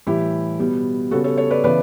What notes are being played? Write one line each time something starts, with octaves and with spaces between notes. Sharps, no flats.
A2 E3 G3 E4 G4
B2 G3 B3
C#3 G3 B3 F#4 A4
A4 C#5
A4 C#5
B4 D5
C#3 E3 B3 B4 D5